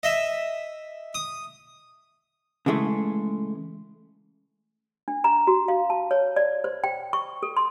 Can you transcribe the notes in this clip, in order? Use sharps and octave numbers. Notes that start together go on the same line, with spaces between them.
D#5 E5
D#6
C#3 E3 G#3 A3
D4
A#5
F#4
F5
A5
C#5
D5
C5
G5
C#6
A4
C6